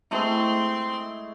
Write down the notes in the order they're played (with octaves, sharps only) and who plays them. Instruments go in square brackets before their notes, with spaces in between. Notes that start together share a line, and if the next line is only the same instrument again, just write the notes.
[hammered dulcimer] G#3 A3 E4 [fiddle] C4 C6